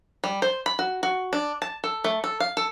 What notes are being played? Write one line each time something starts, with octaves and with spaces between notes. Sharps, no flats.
G3
C5
B5
F#4
F#4
D4
A5
A4
A3
A4
F5
A4